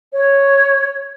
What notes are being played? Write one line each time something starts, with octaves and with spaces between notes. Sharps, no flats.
C#5